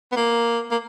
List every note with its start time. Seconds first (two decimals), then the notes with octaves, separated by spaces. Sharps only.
0.12 B3
0.16 A#3
0.71 A#3